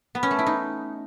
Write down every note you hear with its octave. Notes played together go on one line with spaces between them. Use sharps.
B3
C#4
A3
E4
D#4